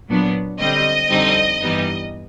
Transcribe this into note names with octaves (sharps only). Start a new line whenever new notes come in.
A#2 F#3 B3 D4
D3 G3 C4 D#5
F2 D3 G3 C4 D#4
G2 E3 G3 B3 D#4